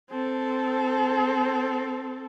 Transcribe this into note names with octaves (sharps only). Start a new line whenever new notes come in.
C4 A4